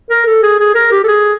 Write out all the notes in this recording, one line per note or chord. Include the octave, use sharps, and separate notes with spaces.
A#4
A4
G#4
G#4
A#4
G4
A4
G#4